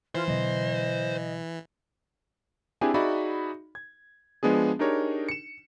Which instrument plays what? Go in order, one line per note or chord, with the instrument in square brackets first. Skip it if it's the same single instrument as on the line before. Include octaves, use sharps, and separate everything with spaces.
[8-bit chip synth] E3 [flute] F4 [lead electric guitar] C5
[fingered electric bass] B2 D3 F#3 [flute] D#5
[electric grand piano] C4 D4 E4 G4 G#4 G#5
D#4 F#4 G#4 D5 E5 B5
G#6
F3 G#3 B3 D4 G#4
D4 D#4 G4 G#4 A#4 C#5
C#7 E7